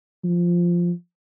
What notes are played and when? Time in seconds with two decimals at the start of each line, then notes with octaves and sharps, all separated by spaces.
0.24 F3